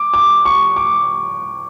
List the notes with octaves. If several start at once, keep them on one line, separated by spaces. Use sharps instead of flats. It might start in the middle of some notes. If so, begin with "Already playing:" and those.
Already playing: D6
D6
C#6
D6